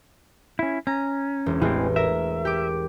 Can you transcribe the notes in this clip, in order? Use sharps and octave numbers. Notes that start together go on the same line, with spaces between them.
C#4 E4
C#4 A#5
E1
A1 E3 G#3 C4
A#4 E5
G4 D6